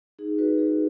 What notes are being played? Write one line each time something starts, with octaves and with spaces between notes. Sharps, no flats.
D#4 G#4
F#4 B4
D#4 G#4